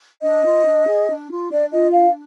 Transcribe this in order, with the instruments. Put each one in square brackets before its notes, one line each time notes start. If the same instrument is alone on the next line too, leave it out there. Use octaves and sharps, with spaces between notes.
[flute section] D4 D#5
F4
D4
G#4
D4
F4
D4 D5
F4 D#5
D4 F5